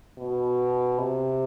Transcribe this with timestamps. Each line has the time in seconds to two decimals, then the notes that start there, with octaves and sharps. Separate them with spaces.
0.18 B2
0.98 C3